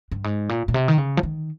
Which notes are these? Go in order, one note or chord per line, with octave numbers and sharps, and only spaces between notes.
G2
G#2
A#2
A#2
C3
D#3
C#3
F3
D#3